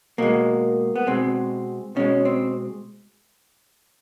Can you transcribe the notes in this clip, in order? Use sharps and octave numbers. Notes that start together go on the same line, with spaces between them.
B2 G#3 A#3
B3
B2 G#3 C4
B2 G#3 C#4
C4